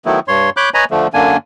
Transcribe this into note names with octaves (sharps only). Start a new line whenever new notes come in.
D#3 F#3 A3 B3 E4
G2 C#5 C6
C#5 B5 D6 F#6 G6
B4 C#5 D#5 G#5 A#5 B5
D3 F3 A3
F#2 D3 A#3 D4 G#5